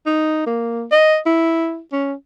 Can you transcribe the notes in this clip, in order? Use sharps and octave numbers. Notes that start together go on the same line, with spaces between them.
D#4
A#3
D#5
E4
C#4